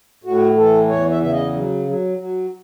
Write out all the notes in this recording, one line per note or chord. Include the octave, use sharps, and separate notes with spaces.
A2 F#4
E3 A4
E2 C#5
E5
C#3 E5
D#5
F#3
F#3
F#3